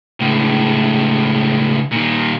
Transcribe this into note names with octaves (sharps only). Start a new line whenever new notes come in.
C#2 A2
A#2 D#3